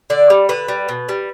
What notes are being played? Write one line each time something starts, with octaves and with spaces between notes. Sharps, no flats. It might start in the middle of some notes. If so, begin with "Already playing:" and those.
D3 D5
G3
D3 B4
G3
B2
G3